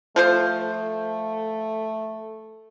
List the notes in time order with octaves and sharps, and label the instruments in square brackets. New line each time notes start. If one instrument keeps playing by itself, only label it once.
[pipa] F3 F4 C5 [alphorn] A3